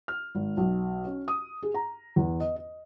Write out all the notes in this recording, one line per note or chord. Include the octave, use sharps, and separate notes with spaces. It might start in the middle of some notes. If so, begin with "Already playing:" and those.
F6
G#1
B1
C#4
D#6
G#4
A#5
E2
D#5
D#5